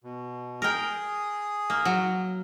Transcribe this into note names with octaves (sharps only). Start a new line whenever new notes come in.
B2
G#4 A#4 G5 D#6
A#3
F#3